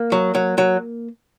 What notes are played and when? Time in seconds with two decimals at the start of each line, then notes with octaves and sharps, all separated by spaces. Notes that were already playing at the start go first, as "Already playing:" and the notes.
Already playing: A#3
0.12 F#3
0.35 F#3
0.58 F#3